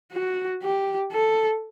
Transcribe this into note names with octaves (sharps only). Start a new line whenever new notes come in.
F#4
G4
A4